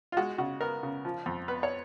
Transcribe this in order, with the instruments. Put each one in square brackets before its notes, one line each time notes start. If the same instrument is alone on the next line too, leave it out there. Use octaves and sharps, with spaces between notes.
[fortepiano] F4
G#3 F#4
C#3 F#4
B3 A#4
C#3
F3
F2
B3 B4
C#5